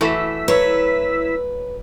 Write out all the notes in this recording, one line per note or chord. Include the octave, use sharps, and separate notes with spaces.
E3 A3 E4 F#4 E6 B6
F#3 B4 C#5